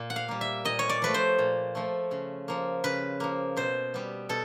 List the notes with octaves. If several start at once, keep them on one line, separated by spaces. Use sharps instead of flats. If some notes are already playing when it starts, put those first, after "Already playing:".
Already playing: A#2 A#3
F#5
F5
G3 A#3
E5
A#2 D#5
C#5
D5
F3 A3 B4
C5
A#2
F3 A3
C#3
F3 A#3
C#3 B4
F3 A#3
B2 C5
G3 B3
B2 A4